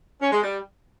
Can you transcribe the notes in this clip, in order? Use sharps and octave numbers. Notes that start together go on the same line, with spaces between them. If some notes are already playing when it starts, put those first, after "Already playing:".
C#4
G#3
G3